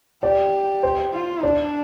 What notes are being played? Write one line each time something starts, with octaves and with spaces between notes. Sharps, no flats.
G4 D5
C5
F4
D4 D5